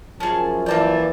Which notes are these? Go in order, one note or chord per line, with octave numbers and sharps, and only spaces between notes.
F#2 F3 F#3 C#4 G#4 A5
E3 A#3 D5 A5 G6